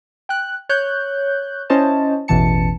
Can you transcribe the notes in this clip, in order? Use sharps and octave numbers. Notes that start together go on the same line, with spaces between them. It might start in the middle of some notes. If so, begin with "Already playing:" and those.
G5 F#6
C#5 F#6 G6
C#4 E4 C5 C#5 D#5 A5
A1 E2 B2 E3 A5 C#7